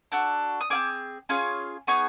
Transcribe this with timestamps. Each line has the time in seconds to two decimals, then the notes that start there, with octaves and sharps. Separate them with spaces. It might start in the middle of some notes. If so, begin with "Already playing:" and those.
0.12 D4 F#4 A4
0.61 D#6
0.70 C4 F4 G#4 D6
1.29 C#4 F4 G#4
1.87 B3 D#4 G#4 C#6